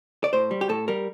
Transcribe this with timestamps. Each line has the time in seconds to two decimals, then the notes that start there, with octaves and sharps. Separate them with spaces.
0.24 D5
0.33 A2 C5
0.51 G3
0.61 G4
0.69 A2 A4
0.88 G3 A#4